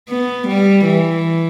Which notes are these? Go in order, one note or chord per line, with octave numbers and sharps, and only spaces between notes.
B3
G3
E3